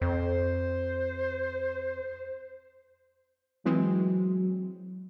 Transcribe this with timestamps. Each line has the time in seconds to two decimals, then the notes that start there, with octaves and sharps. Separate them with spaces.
0.02 F2 C5
3.65 E3 F#3 G#3 C4